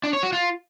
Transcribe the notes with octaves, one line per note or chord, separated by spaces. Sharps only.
D4
C#5
F#4
F4